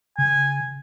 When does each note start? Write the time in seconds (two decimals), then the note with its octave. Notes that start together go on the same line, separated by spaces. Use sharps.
0.18 C#3 G#5